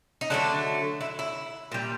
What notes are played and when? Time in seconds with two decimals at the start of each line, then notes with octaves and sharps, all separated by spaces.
0.21 D#4
0.30 D3 F#3 A3 D4
1.01 E4
1.19 E4
1.72 A#2 G3